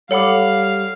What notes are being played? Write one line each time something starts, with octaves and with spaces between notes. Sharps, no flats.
G3 A4 C#5 F5 F#5 B5 D6